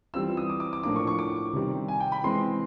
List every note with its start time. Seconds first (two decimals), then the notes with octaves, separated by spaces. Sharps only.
0.14 E3 G3 C4 F4 E6
0.37 D#6
0.50 D6
0.60 D6
0.73 D6
0.83 A2 F3 A#3 D4 D6
0.96 C#6
1.07 C#6
1.19 D6
1.53 C3 D#3 G3 C4
1.88 G#5
2.00 G5
2.12 B5
2.24 E3 G#3 C4 C6